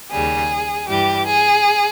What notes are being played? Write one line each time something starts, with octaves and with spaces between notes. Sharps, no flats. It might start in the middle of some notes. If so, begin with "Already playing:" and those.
D#2 C#3 G3 G#4
G2 E3 G3 G4
G#4